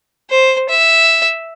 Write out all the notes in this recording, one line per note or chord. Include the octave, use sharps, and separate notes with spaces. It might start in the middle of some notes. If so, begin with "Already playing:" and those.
C5
E5